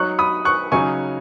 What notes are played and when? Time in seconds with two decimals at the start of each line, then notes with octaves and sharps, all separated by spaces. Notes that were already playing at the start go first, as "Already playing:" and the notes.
Already playing: F#3 D#4 C#6 F#6
0.19 B5 D#6
0.45 C#6 F#6
0.72 C#3 F#3 D#4 G#5 C#6